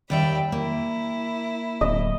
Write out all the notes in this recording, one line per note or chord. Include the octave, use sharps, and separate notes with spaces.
D#2 G3 D5 E5 G5 B5
A#3 E4
D1 D#5